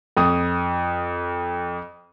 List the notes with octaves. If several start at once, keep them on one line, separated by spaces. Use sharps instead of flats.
F2 D#6